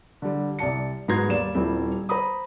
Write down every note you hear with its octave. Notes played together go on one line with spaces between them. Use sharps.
D3 G3
C2 D5 A5 C#7
G#2 B3 F#4 A#5 C6 G#6
D#2 G3 D5 E7
D#1 G3 C4 E4
C5 A#5 B5 D#6